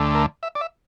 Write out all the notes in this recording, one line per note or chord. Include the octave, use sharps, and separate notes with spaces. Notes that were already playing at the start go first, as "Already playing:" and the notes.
Already playing: D2 D3 A3
A#4
E5
D5
E5